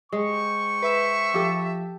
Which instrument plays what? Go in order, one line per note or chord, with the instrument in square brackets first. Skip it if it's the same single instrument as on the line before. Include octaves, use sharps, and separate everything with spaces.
[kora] G#3 [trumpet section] C5 G5 C#6
[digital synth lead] B4 [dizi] E5
[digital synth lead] F3 [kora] G4 A4